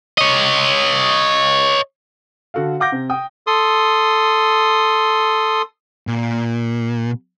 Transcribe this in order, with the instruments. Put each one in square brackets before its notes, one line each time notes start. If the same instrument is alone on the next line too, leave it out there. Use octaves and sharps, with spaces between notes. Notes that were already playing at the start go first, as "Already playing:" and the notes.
[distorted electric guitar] C#5 D#5
[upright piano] D3 F#4 A4 F5
F5 F#5 D6 G6 A#6
C3
G5 D#6
[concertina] A4 C6 D#6
[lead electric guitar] A#2